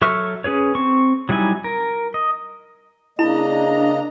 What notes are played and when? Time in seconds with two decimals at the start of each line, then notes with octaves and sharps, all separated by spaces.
0.02 F#3 A4 E5 C#6 F6
0.44 C#4 G#4 B4 C#5
0.75 C4 C#6
1.29 F#3 G3 D#4 E4 G#5
1.64 A#4
2.14 D#5
3.19 C#3 A#3 D4 E4 D#5 A#5 B5